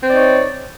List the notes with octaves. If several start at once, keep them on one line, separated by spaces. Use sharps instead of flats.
C4 D#4 C#5 D5